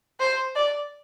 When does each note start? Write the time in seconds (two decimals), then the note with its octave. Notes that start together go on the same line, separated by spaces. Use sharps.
0.20 C5
0.56 D5